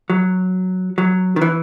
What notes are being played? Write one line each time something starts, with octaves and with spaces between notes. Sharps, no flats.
F#3
F#3
D#3
E3